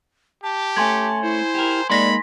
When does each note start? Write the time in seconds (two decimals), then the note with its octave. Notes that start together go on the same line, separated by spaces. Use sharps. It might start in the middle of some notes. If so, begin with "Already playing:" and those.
0.43 G4 A5
0.77 A3 C#4 G#5 C6 G#6
1.23 E4 C5
1.54 G4 A#4
1.90 G#3 A#3 D#4 D5 B5 C6 A#6 B6